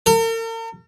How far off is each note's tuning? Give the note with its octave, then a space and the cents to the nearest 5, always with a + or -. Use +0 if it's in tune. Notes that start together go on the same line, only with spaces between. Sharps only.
A#4 -45